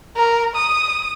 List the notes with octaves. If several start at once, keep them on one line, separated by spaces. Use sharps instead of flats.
A#4
D#6